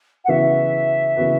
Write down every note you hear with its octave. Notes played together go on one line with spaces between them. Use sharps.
F#5
C#3 E3 B3 F#4 B4 E5
C#3 E3 B3 F#4 B4